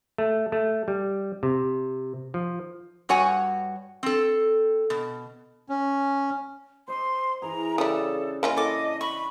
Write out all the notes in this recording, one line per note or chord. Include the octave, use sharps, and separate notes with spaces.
A3
A3
G3
C3
F3
G2 F#4 C#5 F#5 G#5
C4 A4
B2
C#4
C5 D#5 C6
E3 G#4 A#5
C#3 E3 G3 D4 A4 D#6
A#3 C#4 E4 F4 D#5
A4 D#5 D6
B5 C#6